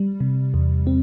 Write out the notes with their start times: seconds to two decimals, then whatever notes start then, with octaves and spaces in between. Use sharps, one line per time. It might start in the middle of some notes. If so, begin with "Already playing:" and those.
Already playing: G3
0.20 C3
0.54 E2
0.87 C4